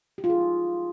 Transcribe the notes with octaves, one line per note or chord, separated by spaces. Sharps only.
G4
F4
G#4
D#4
E4